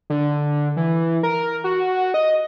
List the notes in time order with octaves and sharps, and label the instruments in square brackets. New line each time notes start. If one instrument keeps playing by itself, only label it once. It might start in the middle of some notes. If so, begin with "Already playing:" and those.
[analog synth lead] D3
E3
A#4
F#4
D#5